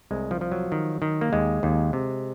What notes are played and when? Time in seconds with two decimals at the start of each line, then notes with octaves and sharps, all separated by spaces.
0.11 C2 G#3
0.31 F3
0.41 F3
0.52 F#3
0.72 D#3
1.02 D#3
1.21 A#3
1.33 D#2 G#3
1.63 D#2
1.93 C3